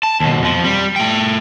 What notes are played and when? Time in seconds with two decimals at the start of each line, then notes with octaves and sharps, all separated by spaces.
0.03 A5
0.20 D#2 B2
0.42 F2 F3
0.65 G3
0.96 A3 G5